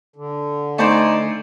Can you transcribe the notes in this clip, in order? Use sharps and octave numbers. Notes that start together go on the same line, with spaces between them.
D3
A3 D#4 C5 D5 G#5